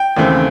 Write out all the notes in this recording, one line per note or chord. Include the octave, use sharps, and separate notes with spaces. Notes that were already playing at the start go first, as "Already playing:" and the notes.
Already playing: G5
D#2 C#3 E3 A3 C4